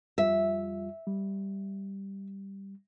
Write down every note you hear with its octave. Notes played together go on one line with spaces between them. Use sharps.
F2 G3 F4 E5
G3